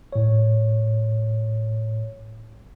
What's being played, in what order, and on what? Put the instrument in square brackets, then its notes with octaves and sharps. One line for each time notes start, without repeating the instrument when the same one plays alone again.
[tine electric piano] A2 C#5